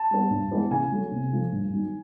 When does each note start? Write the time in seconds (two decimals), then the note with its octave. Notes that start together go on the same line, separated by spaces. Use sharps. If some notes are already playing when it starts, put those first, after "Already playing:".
Already playing: A5
0.11 G3 B3
0.30 G2
0.51 E3 G#3 B3
0.71 C#3 G#5
0.92 F#3 A3
1.11 C3
1.33 F3 A3
1.52 G2
1.73 D#3 F#3